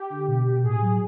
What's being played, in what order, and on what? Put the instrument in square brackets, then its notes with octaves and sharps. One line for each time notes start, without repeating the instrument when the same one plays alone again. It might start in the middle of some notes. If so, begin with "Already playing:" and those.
Already playing: [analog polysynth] G4
D3
B2
B2
A2 G#4
F#3